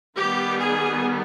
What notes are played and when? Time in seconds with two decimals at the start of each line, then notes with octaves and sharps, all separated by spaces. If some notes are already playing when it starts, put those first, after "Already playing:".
0.16 D#3 G3 B3 G4
0.58 G#4